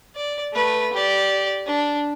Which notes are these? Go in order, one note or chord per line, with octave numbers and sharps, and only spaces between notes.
D5
A3 B4
G4 D5
D4